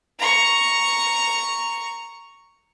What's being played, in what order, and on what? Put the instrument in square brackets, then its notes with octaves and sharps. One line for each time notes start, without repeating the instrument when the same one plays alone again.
[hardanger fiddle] A#5 C#6